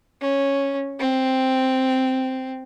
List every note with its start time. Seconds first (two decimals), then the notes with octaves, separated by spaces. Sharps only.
0.21 C#4
1.00 C4